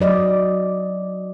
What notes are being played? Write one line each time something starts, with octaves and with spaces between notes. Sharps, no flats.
F#3 D5 D#5